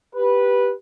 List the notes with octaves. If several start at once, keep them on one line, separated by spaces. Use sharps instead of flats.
G4 B4